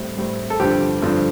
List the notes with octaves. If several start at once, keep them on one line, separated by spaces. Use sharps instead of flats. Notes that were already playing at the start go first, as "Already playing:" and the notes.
Already playing: A2 G3 C4
A2 G3 C4
A4
G2 D3 F3 C4 G4
G2 D3 F3 C4